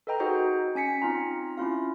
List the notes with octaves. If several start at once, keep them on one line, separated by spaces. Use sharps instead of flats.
A4 B4 D#5 G5 A#5
D#4 F#4 G#4 C5 D#5
C#4 G#5 B6 C#7
C4 D#4 F4 A#5
C#4 E4 F4 F5